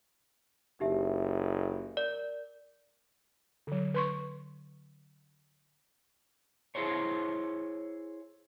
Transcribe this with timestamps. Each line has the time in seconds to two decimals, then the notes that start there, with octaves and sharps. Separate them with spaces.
0.80 F#1 D#4 G4 E5
1.97 A#4 D5
3.67 D3 F#3
3.94 B4 C6 C#6
6.75 E4 G#4 C5 C#5